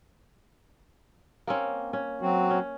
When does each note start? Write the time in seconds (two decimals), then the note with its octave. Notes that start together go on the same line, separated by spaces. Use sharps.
1.47 A#3 C4 C#4
1.93 C#4
2.21 F#3 C4 F#4
2.50 C#4